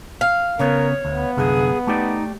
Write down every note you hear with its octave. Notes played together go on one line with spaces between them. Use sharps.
F5
C#3 B3 A#4 C#5
D2 B3
C2 F#2 D3 G#4
A3 D#4 G4 D5